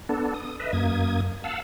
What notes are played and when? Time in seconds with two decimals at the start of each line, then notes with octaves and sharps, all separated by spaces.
0.09 B3 D4 A4
0.34 D#6
0.60 B4 D#5 E5
0.73 F#2 A#3 D#6 G#6
1.44 F5 F#5 A5 E6